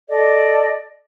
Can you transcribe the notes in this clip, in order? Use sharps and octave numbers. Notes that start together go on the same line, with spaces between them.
A4 D5 D#5